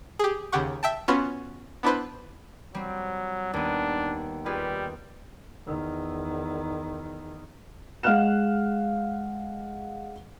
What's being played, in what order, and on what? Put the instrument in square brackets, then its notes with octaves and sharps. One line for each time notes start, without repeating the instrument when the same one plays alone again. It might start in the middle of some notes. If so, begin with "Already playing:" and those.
[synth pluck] G4 G#4
D#2 C#3 G4 F#5 C#6
E5 G5 A5
B3 C#4 F4 F#4 B4
B3 D4 E4 B4 C5
[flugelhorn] F#3 [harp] G3 C4
[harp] D#2 B3 [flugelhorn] D4
[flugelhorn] G3 [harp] F4 G#4 B4
[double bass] E2 D#3
[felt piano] G#3 F5 F#5 F6 F#6 E7